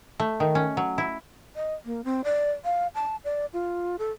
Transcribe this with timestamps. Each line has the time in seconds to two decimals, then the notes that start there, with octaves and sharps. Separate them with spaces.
0.20 A3
0.40 D#3
0.55 C#4
0.77 F#3
0.98 E4
1.56 D#5
1.85 A#3
2.04 C4
2.24 D5
2.65 F5
2.95 A5
3.25 D5
3.53 F4
3.99 A4